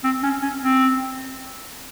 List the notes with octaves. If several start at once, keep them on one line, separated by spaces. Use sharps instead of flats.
C4
C#4
C#4
C4